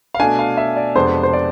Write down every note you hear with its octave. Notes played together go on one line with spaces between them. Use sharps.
F5
B2 A3 D4 G#5
F5
E5
D5
F2 C3 G#3 B3 D4 C5
C5
D5